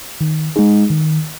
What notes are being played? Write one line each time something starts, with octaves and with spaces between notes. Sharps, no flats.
D#3
G#3 D#4 G#4
D#3